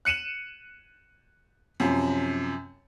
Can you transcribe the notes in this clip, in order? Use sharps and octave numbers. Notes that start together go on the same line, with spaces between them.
F#6 C#7 D#7 E7 F#7
F#2 C3 F3